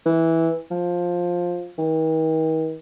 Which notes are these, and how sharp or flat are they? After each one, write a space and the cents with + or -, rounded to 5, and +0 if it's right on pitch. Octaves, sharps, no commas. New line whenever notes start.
E3 -10
F3 +10
D#3 +45